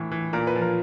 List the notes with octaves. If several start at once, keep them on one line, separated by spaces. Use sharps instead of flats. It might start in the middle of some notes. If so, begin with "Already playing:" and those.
Already playing: A2 E3
E3
A#2 A#4
B4
F3
A#4